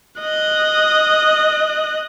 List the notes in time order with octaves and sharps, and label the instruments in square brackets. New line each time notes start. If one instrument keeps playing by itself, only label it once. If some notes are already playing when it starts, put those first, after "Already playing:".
[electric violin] D#5 F#6